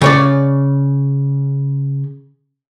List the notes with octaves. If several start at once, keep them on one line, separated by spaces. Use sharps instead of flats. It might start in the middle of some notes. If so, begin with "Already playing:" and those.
C#3 C#5 D5